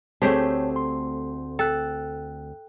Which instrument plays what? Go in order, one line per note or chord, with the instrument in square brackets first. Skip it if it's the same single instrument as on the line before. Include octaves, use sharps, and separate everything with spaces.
[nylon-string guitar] D2 C4 C5 [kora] A3 G4 G#4 [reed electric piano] C#5 A5
[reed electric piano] C6
[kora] A4 [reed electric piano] G5 F#6